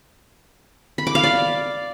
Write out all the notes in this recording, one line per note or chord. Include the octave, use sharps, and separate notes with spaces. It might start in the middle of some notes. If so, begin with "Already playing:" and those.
B5
D6
F5
D5